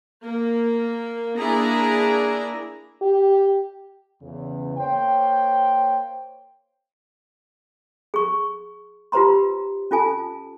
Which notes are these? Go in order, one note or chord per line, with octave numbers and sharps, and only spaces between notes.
A#3
A#3 D4 E4 G#4 A#5
G4
E2 C#3
A#3 C5 C#5 G5
G#4 C#6
F4 G4 B4 C5 A#5 C6
C#4 F4 A4 G#5 A5